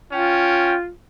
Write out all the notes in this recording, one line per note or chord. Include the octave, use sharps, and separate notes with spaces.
C#4 F4 G5